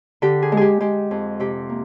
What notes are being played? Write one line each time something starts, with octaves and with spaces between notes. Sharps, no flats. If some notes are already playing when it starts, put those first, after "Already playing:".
D3 G4
G#4
G#3
G4 G#4
G#3 G4
F2
C3 G4
A#3